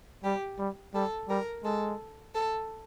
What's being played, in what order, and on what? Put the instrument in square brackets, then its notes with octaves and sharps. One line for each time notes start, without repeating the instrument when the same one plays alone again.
[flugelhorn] G3 [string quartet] G4
[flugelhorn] G3
[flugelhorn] G3 [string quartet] A4
[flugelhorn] G3 [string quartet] A#4
[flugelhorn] G#3 [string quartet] A4
[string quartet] A4